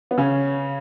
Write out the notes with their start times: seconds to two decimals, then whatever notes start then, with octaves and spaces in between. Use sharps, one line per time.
0.11 B3
0.18 C#3 C#4